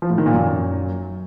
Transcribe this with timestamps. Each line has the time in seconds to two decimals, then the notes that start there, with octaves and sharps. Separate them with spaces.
0.02 F3
0.10 A2
0.18 D#3
0.26 A#2
0.34 F#2